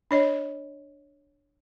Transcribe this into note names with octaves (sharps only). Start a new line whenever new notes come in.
D4 C#5 D#5